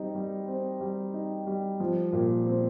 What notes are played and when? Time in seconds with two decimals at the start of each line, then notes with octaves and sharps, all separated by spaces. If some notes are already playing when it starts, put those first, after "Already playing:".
Already playing: G3 C4 D#4
0.15 G3
0.48 C4
0.81 G3
1.14 D#4
1.47 G3
1.80 F3
2.13 A#2
2.46 C4